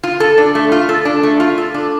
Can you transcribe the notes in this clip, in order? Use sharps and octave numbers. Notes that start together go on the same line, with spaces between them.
F4
A4
D4
A3
F4
A4
D4
A3
F4
A4
D4